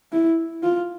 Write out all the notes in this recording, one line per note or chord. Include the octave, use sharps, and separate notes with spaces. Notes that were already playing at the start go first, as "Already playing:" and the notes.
E4
F4